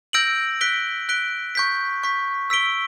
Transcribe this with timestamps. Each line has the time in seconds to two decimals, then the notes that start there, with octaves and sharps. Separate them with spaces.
0.13 E6 G6 A#6 D7 F#7
0.61 F#6 B6 D7 G7
1.09 F#6 B6 D7 G7
1.55 C#6 G6 B6
2.03 C#6 G6 B6
2.50 E6 B6 D7 G7